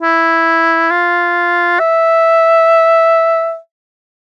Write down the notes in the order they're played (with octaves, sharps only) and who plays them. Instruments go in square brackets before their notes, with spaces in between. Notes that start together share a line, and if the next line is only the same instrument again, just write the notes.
[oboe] E4
F4
E5